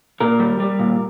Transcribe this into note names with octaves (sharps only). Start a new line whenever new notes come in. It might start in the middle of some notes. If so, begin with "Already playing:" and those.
A#2 A#4
G3
G3
A#2